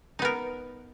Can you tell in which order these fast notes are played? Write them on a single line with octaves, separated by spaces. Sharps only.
D#4 B3 A#4